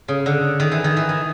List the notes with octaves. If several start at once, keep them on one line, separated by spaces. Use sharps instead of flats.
C#3
D3
D#3
E3
D#3
E3
D#3